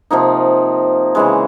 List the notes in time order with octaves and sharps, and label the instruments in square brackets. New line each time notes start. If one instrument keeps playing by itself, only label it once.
[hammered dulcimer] C3 F3 A#3 D#4
C#3 E3 G#3